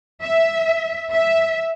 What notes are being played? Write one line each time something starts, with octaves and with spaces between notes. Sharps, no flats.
E5
E5